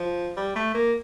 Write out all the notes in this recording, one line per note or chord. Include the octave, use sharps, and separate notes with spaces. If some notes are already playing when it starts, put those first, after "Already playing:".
Already playing: F3
G3
A3
A#3